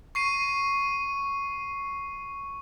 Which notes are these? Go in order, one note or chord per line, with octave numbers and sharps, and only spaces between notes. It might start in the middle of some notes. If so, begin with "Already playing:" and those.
C#6 C7 D#7